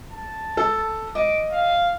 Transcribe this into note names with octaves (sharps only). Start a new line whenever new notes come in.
A5
A4
D#5 D6
F5